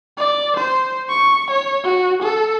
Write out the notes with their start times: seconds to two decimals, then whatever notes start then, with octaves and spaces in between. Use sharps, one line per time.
0.17 D5
0.57 C5
1.09 C#6
1.51 C#5
1.84 F#4
2.23 A4